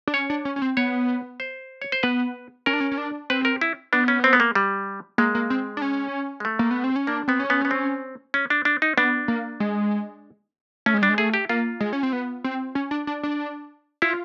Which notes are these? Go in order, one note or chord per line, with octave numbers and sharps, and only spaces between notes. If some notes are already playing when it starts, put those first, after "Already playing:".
D4
C#4 C#5
D4
C#4
C#4
C4
B3 C#5
C5
C#5
C5
B3 B4
C#4 A#4
D4
C#4
C#4
D4
C4 B4
A#4
E4
B3 D4
C#4
C4
B3
A#3
G3
G#3 A#3
A#3
C4
D4
C#4
G#3
A3
A#3
B3
C4
C#4
A#3 D4
B3 C4
C#4
B3
B3
C4
C#4
D4
D4
D#4
B3 D4
A#3
G#3
A3 C#4
G#3
G3 D4
G#3
A3 G#4
G4
A#3 F4
G#3
C#4
C4
B3
C4
C#4
D4
D4
D4
E4 F4